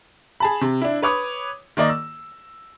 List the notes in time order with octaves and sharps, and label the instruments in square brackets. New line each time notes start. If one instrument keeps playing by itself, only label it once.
[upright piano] G#4 A5 B5
C3
D4 E4
B4 C#5 D6 D#6
D#3 A#3 D5 D#5
E6